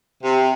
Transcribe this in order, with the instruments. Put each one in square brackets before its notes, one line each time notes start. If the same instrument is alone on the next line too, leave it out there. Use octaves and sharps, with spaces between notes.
[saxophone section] C3